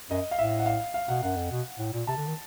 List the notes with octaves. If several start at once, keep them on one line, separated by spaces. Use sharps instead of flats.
F#2 D#5
F5
A2 E5
F#5
F5
F5
B2 F#5
F#2 F#5
F2
B2
A2
A#2
C3 A5
D3
D#3